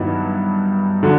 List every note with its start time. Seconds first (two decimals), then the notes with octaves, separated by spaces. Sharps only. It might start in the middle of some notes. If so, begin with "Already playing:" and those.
Already playing: G2 D#3 F#3 B3 E4
1.03 D3 F#3